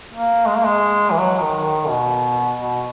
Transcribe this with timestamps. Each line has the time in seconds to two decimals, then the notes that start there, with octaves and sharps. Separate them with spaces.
0.12 A#3
0.47 G#3
0.57 A#3
0.66 G#3
1.11 E3
1.18 F#3
1.42 D#3
1.64 D#3
1.88 B2
2.58 B2